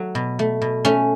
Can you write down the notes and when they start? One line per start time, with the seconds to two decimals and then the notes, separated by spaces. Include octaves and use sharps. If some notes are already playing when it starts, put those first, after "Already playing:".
Already playing: F#3 A3
0.15 B2
0.39 A3
0.62 B2
0.85 A3 C#4